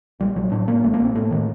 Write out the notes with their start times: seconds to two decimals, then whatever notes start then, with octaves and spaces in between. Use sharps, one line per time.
0.20 A#1 G3
0.36 A#1 F#3
0.51 A2 D4
0.67 A2 A#3
0.84 A#1 A3
0.94 A#3
0.99 A#1
1.05 C4
1.15 A2 A3
1.31 A2 D#3